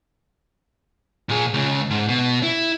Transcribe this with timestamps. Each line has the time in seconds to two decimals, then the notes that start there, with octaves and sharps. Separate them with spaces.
1.29 A#2 G#4
1.54 C#2 C#3
1.90 G#2
2.09 B2
2.43 E4